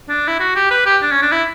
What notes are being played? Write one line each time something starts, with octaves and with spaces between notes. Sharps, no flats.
D4
E4
F#4
G4
B4
G4
D4
C#4
D4
E4